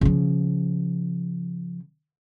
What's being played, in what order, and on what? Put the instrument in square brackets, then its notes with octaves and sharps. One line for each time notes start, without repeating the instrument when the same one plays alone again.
[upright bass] C#3 F3